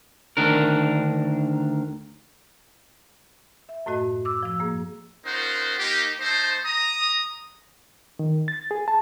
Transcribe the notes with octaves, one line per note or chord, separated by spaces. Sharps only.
D2 D#3 D4 A#4
E5
F#2 A2 A3 F#4 D#5
D6 E6
F3 E6
G2 A#3 G#4
C#4 D#4 F4 A#4 C5 F#5
A#3 D#4 G4
A3 D#4 A4 C5
A#5 D#6
D#3
A6
G#4
A5